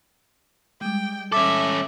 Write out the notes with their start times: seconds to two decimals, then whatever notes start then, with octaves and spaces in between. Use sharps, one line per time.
0.81 G3 G#3 G5
1.32 C#4 A4 E5 D6